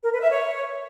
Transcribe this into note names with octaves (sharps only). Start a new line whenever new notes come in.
A#4
B4
E5
C#5